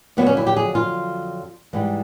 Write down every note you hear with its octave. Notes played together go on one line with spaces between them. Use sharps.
F2 D3 F#3 B3
C#4
E4
G4
G#4
F4
G#2 E3 G3